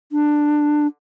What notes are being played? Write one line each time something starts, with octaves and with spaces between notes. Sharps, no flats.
D4